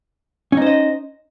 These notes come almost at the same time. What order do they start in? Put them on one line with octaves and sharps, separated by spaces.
C#4 D#4 C5 D#5